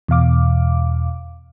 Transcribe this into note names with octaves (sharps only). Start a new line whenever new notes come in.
E2 B2 F5 D6